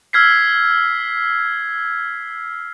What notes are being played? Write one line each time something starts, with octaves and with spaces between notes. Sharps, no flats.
E6 F6 G#6 B6 C7